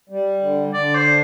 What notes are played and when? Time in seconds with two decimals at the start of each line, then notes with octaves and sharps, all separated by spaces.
0.10 G3
0.41 D3
0.73 D3 D5
0.95 C5
1.06 D4